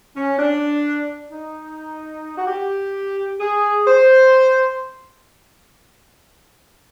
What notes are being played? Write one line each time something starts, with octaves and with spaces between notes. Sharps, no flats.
C#4
D4
D#4
F#4
G4
G#4
C5